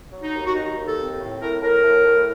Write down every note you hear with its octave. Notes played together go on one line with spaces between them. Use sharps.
F#3
D#4
D#2
F#4
D#3 D#4
D#2
A4
C4
A2
A2 A#4
A2 A#4
A2
A2